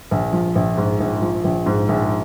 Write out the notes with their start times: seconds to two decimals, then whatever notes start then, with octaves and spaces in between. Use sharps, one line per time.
0.11 A#1
0.33 F3
0.55 A#1
0.77 G#2
1.00 A#1
1.22 F3
1.44 A#1
1.66 G#2
1.89 A#1